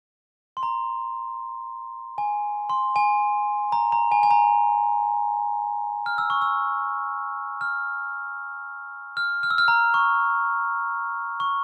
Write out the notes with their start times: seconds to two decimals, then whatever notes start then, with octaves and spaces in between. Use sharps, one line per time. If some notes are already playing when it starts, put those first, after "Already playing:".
0.57 C6
0.63 A#5
2.18 G#5
2.69 C6
2.96 G#5
3.72 A#5
3.92 A#5
4.12 G#5
4.23 G#5
4.31 A#5
6.06 F6
6.18 E6
6.30 C#6
6.41 E6
7.61 F6
9.17 F6
9.43 F6
9.50 E6
9.58 F6
9.68 A#5
9.94 C#6
11.40 C#6